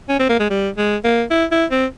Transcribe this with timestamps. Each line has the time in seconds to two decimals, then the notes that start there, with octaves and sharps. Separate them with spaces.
0.09 C#4
0.19 C4
0.29 A#3
0.40 G#3
0.50 G3
0.78 G#3
1.04 A#3
1.31 E4
1.51 E4
1.71 C4